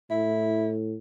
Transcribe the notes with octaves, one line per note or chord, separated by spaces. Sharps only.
A2 E4